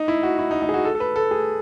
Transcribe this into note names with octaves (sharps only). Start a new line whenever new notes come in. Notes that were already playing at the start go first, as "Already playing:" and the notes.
Already playing: D#4
E4
F#4
E4
D#4
D#4
G#4
F#4
A4
A4
B4
A4
G#4